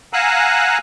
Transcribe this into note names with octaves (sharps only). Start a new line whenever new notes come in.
F5 F#5 G#5 A#5 E6 F#6